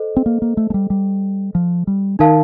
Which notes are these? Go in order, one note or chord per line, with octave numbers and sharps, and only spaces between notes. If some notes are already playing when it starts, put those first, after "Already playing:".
Already playing: A4 C5 D#5
C4
A#3
A#3
A3
A3
G3
G3
F3
G3
D#3 D#4 A#4 F5 A5